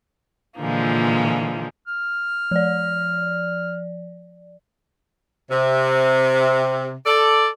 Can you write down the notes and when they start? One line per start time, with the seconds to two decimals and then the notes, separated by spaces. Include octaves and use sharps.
0.59 A#2 D3 E3 F3 G#3 A#3
1.88 F6
2.51 F3 D5
5.51 C3
7.06 A4 D5